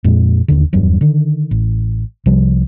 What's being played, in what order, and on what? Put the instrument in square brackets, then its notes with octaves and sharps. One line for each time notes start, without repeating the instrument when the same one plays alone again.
[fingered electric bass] F2 A#2 G#3
E1 D#2 D3
D#1 E2 G2 F#3
D3 D#3
A1
C2 C3 F3 G3